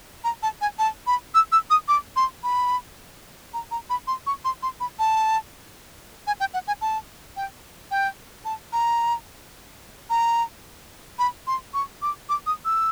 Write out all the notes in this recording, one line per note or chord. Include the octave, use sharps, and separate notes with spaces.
A#5
A5
G#5
A5
B5
E6
E6
D#6
D6
C6
B5
A#5
A#5
B5
C6
C#6
C6
C6
B5
A5
G#5
G5
F#5
G#5
A5
G5
G5
A5
A#5
A#5
B5
C6
C#6
D6
D6
D#6
E6